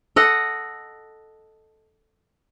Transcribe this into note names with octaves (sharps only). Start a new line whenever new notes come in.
A4 D#5 F#5